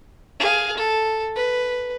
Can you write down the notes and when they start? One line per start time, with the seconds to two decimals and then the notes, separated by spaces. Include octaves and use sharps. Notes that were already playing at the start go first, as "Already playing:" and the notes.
0.40 G#4 F5
0.77 A4
1.36 B4